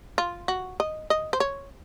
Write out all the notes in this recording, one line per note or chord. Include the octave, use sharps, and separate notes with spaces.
F4
F#4
D#5
D#5
C5
C#5